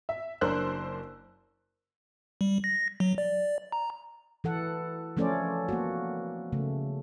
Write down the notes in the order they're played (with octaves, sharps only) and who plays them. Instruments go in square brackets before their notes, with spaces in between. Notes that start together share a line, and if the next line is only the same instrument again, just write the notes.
[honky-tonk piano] E5
F#1 D4 A#4 C5 E6 F#6
[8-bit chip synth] G3
A#6
F#3
D5
A#5
[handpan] E3 A4 F#5
F3 A3 C#4 A4 C5 D5
A#3 B3 F#4
C#3 A3